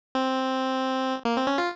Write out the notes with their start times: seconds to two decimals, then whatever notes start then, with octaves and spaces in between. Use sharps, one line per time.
0.15 C4
1.25 A#3
1.36 C4
1.47 C#4
1.58 F4